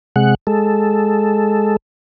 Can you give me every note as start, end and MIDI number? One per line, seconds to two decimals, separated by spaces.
0.16 0.35 48
0.16 0.35 56
0.16 0.35 78
0.47 1.76 56
0.47 1.76 69